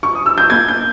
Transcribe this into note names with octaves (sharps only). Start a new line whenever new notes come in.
C#6
D#6
E6
G6
A#3 G#6
G6